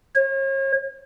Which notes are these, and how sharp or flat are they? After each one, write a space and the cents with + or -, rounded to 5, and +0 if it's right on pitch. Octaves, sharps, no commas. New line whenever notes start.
C#5 -40